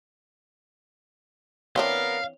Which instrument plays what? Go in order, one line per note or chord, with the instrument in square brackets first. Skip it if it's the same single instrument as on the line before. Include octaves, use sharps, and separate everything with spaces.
[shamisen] E3 C4 D4 [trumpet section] B3 A#4 [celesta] C#5 G7 [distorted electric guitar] F5